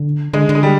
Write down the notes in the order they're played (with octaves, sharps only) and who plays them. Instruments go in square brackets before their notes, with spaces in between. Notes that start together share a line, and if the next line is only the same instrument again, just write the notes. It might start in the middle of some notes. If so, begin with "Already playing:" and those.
Already playing: [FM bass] D3
[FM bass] D3 [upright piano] G#3
[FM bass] D3
[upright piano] G#3
G3